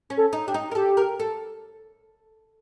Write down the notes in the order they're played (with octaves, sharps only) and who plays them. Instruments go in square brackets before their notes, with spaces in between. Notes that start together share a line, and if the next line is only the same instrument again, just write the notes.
[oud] C#4
[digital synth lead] A4
[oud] D#4
[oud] D4 [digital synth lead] G4
[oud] D#4
A#4
[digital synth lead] G4 [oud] A4
[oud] A#4
A4